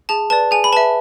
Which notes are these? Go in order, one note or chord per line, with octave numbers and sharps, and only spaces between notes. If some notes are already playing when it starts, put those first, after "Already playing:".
G#4 A5
B4 D5 A5
G#4 G#5
B5
B4 E5 A5